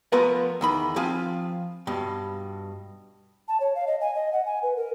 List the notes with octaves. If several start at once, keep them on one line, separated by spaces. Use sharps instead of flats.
F3 A3 B3 F4 A#4 B4
E2 D#3 B5
F3 C4 F4 G#5
G2 B2
A5
C#5
F5
D#5
G#5
D#5
F#5
G#5
B4
A#4